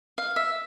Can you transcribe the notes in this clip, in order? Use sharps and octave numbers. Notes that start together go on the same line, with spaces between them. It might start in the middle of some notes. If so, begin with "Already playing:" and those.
F5
E5